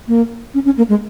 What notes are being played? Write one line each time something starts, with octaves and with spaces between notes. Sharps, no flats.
A#3
C#4
C#4
A#3
G#3